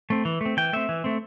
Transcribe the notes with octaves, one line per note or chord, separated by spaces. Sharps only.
A3 C4
E3
A3 C4
E3 G5
A3 C4 E5
E3
A3 C4